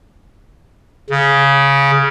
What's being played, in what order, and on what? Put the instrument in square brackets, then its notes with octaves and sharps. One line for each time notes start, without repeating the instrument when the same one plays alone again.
[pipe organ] C#3